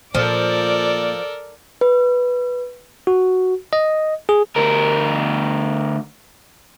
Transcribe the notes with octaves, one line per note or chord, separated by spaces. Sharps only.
A#2 F3 A4 A#4 D5
B4
F#4
D#5
G#4
D2 A#4